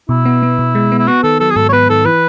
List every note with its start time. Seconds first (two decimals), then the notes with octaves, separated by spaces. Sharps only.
0.09 B2 E4
0.25 B3
0.43 B3
0.59 B2
0.75 G#3
0.92 B3
0.99 E4
1.07 B3 F#4
1.24 D#3 A4
1.40 F#3 A4
1.51 G#4
1.56 G#2 A4
1.69 C#5
1.73 B3 B4
1.89 D#3 A4
2.05 E3 B4